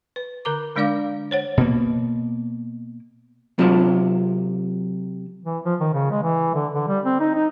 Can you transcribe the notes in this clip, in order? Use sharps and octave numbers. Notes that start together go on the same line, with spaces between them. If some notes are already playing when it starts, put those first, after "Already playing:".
B4
D3 A#4 A#5 D6
D3 G#3 D4 D5 F5 D6
C5 C#5 F#5
B2 A#3
C3 F#3 F4 A5
E3
F3
D#3
C#3
G#3
E3
D3
D3
G3
C4
D#4
D#4